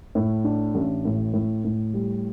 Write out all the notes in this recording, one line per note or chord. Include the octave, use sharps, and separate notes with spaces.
A2
D4
A1
A2
A2
A2
G3